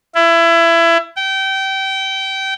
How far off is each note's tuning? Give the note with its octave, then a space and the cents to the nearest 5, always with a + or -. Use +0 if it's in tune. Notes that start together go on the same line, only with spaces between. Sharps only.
E4 +25
G5 -25